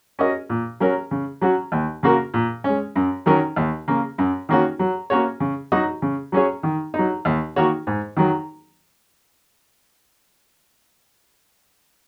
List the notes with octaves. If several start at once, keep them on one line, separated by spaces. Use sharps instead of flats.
C#4 F#4 A#4 D#5
A#2
F#3 C#4 A#4
C#3
F#3 C#4 F#4
D#2
C#3 A#3 F#4 A#4
A#2
G#3 C#4
F#2
D#3 F#3 C#4 A#4
D#2
C#3 A#3
F#2
D#3 A#3 C#4 F#4
F#3
A#3 C#4 F#4 C#5
C#3
F#3 D#4 F#4 D#5
C#3
F#3 C#4 G#4 C#5
D#3
F#3 D#4
D#2
D#3 A#3 F#4 C#5
G#2
D#3 F#3